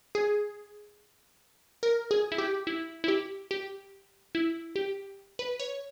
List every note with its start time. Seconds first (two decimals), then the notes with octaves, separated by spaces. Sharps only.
0.15 G#4
1.83 A#4
2.11 G#4
2.32 E4
2.38 G4
2.67 E4
3.04 E4
3.08 G4
3.51 G4
4.35 E4
4.76 G4
5.39 B4
5.60 C#5